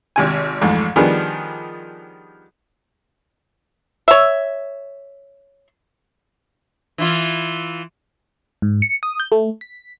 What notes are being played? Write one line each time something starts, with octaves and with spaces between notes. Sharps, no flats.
G#1 C3 G#5
A1 F2 G#2
D#3 F3 G3 B3 D4 G#4
C#5 E5
E3 E4 F4
G#2
C#7
D#6
G6
A3
B6